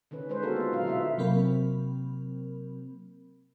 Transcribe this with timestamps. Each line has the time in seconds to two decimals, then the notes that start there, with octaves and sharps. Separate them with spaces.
0.11 D3 D#3 C#4 B4
0.29 G#3 D#4 B4 C5
0.43 A#3 B3 D#4 F#4 A4 A#4
0.56 D#4 F4
0.72 A#2 D3 F#3 A4 F5
0.85 B2 D3 E4 F4 B4 E5
1.18 C3 F#3 A#3 C4 A#4 B5